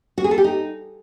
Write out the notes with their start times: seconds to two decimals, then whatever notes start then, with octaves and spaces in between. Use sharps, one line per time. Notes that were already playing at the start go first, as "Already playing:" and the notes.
0.18 F#4
0.24 G#4
0.31 A4
0.38 G4
0.44 D#4